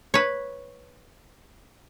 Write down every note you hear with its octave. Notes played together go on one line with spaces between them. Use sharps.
B4 C#5